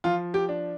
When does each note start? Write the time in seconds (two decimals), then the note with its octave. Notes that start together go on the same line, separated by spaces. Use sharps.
0.04 F3 F4
0.34 G4
0.49 D4